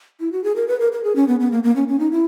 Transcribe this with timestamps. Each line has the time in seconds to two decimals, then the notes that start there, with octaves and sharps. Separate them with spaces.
0.20 E4
0.32 F#4
0.44 G#4
0.56 A#4
0.68 B4
0.80 A#4
0.92 A#4
1.04 G#4
1.16 C#4
1.28 B3
1.40 B3
1.52 A#3
1.63 A#3
1.76 C#4
1.88 C#4
1.99 D#4
2.12 E4